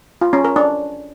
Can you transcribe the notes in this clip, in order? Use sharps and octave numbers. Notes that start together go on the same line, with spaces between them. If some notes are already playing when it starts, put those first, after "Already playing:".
F4
C#4
A#4
D4